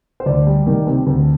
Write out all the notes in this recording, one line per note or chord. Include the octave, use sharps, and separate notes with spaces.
C5
D2 D5
G3
D#3
C3
D2